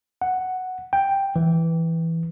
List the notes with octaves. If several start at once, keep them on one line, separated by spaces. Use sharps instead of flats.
F#5
G5
E3